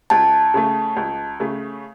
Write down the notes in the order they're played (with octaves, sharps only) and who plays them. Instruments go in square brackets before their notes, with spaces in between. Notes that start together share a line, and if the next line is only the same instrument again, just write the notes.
[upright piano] C#2 [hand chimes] A5
[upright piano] C#3 A3
C#2
C#3 A3